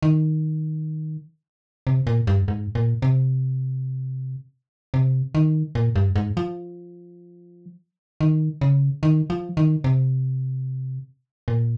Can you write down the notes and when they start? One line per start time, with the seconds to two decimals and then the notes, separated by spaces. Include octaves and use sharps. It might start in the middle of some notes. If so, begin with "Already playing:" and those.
0.02 D#3
1.87 C3
2.07 A#2
2.27 G2
2.48 G#2
2.75 A#2
3.02 C3
4.94 C3
5.35 D#3
5.75 A#2
5.96 G2
6.16 G#2
6.37 F3
8.21 D#3
8.61 C#3
9.03 D#3
9.30 F3
9.57 D#3
9.84 C3
11.48 A#2